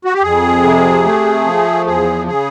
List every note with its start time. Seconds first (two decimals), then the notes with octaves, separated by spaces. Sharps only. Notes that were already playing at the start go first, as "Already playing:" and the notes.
0.05 F#4
0.14 G4
0.22 F2 G#4
0.63 C3
1.04 A3
1.45 F3
1.86 E2 G#4
2.27 C#3 G#4